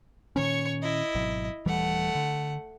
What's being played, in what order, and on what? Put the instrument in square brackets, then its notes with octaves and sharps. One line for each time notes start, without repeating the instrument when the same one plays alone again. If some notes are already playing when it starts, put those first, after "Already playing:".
[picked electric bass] A#2 D#3 C#4 [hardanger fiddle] C#5 C#6
[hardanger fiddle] E4 D#5
[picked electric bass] G#1 B2 F#3
[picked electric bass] D#1 E3 G3 [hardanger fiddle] A3 F#5
[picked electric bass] D3